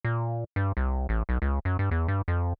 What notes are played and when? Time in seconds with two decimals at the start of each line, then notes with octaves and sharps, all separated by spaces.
0.05 A#2
0.56 G2
0.77 C2
1.09 A1
1.29 B1
1.42 C#2
1.65 F#2
1.79 G2
1.91 E2
2.08 G2
2.28 F2